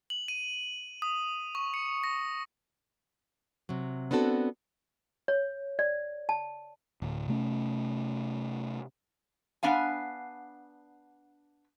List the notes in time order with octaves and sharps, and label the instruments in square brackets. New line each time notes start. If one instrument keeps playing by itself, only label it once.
[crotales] F#7
D#7
D#6
C#6
C#7
A#6
[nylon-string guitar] C3 F#3
B3 C4 D4 F#4 A4
[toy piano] C#5
D5
A5
[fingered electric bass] D1
C3 A3 C#4
[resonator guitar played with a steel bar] B3 D4 F5 G#5